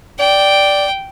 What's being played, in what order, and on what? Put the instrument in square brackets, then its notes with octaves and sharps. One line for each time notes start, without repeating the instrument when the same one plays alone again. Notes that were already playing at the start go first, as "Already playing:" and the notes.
[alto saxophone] D5 [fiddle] G5